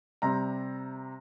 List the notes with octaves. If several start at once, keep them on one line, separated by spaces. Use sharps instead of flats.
C3 G3 C4 A#5